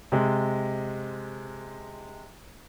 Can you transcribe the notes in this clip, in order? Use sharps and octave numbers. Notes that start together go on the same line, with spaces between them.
C3 G#3